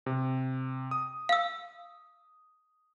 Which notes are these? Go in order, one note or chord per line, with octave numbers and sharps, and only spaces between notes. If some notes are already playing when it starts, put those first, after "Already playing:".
C3
D#6
F5 E6